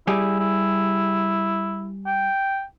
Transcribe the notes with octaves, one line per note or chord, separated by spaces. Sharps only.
G3 E4 G4 G#4
E4
G5